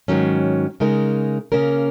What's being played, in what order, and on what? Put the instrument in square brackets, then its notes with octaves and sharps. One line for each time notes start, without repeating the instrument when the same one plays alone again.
[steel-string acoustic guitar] G#2 D#3 F#3 C#4
C#3 G#3 D#4 A#4
C#3 A#3 C#4 A#4